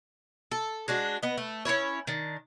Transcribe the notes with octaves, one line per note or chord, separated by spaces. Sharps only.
A4
G#3 D4 F#4
B3 D#5
A3
C#4 D4 E4 C#5
D#3 D4